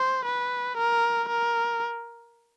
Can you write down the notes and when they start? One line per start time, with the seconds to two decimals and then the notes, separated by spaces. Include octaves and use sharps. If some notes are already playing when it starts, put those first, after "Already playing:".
Already playing: C5
0.25 B4
0.78 A#4
1.29 A#4